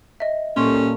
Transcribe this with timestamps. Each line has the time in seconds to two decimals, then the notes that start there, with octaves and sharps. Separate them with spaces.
0.20 D#5 E5
0.56 A#2 G3 A#3 C#4 A4 C6 C#6